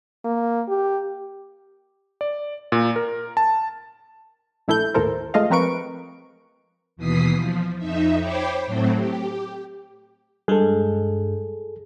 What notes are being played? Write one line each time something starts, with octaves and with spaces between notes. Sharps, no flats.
A#3
G4
D5
A#2
A#4
A5
A#1 A3 E4 A4 G6
G#1 D#2 A2 A4 A#4 C5
G#3 A3 F4 D#5 F5
F3 C4 A#4 B4 C#6 D7
D#2 B2 E3 D#6 B6 C7
F3
F2 D#4 E5
C5 C#5 G5 B5 D6
A2 F#3 A3 C4
G4
G2 G#3 G#4 A4